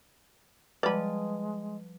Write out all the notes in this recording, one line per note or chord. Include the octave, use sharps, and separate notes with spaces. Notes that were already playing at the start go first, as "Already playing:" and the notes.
F3 G3 G#3 B4 D5 A5 B5